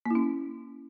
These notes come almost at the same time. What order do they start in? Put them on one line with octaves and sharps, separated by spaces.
A#3 E4 C#4